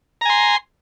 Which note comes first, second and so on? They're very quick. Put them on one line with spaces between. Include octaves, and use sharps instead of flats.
A#5 G#5 C6